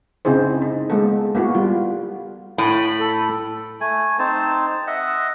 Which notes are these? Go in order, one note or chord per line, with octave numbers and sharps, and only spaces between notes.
C#3 C4 D#4 E4 G#4 C5
D#4
G#3 A#3 B3 A4
A#3 B3 E4 F#4
G3 F4
A2 B5
A4
A3 G#5
C4 D#4 C5 A5
D#5 E5 F#5